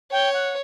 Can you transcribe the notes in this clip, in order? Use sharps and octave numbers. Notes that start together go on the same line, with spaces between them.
C#5 G5
F#5